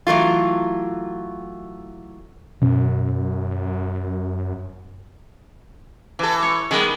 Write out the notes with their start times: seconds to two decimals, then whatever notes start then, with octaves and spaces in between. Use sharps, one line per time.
0.07 E3 F#3 A3 F4
2.62 F#2 B2 C#4
6.19 E3 A4
6.43 C#5
6.71 D#3 G3 G#3 B3